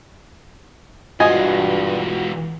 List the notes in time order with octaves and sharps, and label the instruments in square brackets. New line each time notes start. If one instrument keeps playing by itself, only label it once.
[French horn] G2 [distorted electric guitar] E3 G#3 [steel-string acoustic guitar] F4 F#4 [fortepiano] D#5 G#5